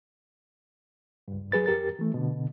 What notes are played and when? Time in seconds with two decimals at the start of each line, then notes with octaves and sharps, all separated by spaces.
1.28 C#2 G2
1.52 F#3 G#4 B4 A6
1.66 F2 G4 A#4 A6
1.99 E3 A3
2.14 B2 D3